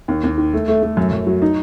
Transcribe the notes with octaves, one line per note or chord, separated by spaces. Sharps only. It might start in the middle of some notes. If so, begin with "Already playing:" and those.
D#2
D#2
D#3
A3
A3
A3
F#2
F#2
F#3
D#4